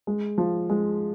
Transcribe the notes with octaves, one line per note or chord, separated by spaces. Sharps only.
G#3
F3
G#3